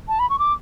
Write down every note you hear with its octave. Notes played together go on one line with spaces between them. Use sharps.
A5
B5
C#6
D6